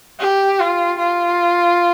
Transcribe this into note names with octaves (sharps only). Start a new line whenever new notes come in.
G4
F4
F4